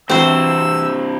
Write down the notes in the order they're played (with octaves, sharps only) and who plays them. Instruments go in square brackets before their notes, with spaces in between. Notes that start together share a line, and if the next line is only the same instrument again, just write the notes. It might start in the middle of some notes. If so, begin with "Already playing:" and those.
[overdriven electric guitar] G2 C3 [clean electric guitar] E3 E4 F#4 [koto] C4 C5 [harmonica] E6